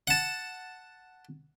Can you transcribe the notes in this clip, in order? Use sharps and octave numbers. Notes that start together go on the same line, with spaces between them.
F#5 A5